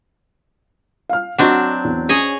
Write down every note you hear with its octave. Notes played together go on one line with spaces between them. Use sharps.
F5 F6
F#3 C4 D4 F#4 D#5 F#5
E2
C#4 G#4 C#5 D#5